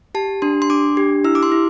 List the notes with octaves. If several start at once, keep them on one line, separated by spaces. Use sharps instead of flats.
G4 A5
D4 C6
C6
D4 D6
G4
E4 E6
D6
C6
E4